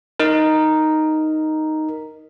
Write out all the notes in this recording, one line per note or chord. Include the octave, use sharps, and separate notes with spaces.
D#4 A#4